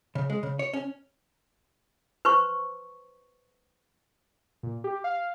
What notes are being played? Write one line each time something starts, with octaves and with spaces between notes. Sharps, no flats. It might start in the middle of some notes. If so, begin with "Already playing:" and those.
C#3
G#3
C#3
C#5
C#4
B4 C5 C6 C#6
A#2
G4
F5